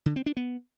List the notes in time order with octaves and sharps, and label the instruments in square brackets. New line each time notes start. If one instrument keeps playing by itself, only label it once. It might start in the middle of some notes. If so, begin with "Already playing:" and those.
[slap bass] D3
C4
D4
B3